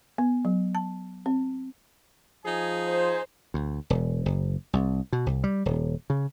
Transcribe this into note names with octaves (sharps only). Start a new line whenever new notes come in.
B3
F#3
A5
C4
F3 D#4 G#4 G#5
C5
D2
E1
F#1
C2
B2
C2
G3
D#1
C#3